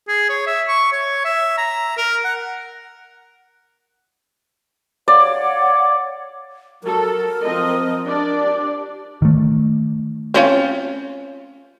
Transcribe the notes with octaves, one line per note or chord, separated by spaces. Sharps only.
G#4
C#5
E5
C#6
C#5
E5
A#5
A#4
F#5
C#5 D5 F5 F#5
F#3 A4 A#4
F3 C4 D#5
D4 G4 D5
D#3 A3
C4 C#4 F4